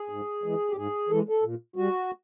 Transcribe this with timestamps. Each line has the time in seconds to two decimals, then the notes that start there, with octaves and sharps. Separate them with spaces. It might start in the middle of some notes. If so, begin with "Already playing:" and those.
Already playing: G#4
0.09 G#2
0.44 E3 G#3
0.70 G4
0.76 G#2 G#4
1.09 E3 G#3 A4
1.29 A4
1.43 A#2
1.76 G3 F#4